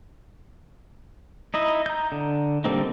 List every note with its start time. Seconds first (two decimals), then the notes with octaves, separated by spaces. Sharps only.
1.54 D#4 E4 D#5
1.86 A#5 G6
2.12 D3
2.64 D3 G3 A#3 C4 D#4